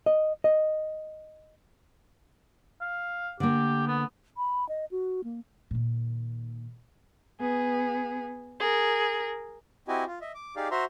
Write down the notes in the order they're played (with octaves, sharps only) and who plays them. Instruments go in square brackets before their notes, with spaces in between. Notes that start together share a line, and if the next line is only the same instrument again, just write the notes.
[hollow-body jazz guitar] D#5
D#5
[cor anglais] F5
[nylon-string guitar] D3 A#3 [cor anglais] G4
[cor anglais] B3
[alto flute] B5
D#5
F#4
A#3
[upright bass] A#2 D#3
[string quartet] B3 G#4
G#4 A#4
[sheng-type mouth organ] C4 E4 F#4 G4 D#5 G#5
F4
D#5 E5
D6
D#4 G4 G#4 D5 F5
F#4 C5 E5 A#5 C6